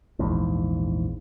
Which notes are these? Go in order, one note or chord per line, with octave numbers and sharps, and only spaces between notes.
A#1 E2 G#2